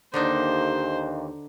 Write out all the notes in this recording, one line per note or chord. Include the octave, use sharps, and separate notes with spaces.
D#2 D3 D4 D#4 C5